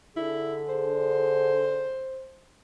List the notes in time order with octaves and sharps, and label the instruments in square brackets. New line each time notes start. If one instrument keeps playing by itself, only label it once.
[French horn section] D3 G#4 [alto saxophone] E4
[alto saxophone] C5